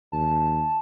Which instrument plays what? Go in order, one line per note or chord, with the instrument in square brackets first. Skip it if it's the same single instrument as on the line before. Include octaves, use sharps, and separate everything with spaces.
[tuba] D#2 [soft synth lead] A5